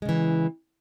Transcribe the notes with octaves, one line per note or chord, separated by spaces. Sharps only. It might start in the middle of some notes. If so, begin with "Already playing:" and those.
C#3 E3 G#3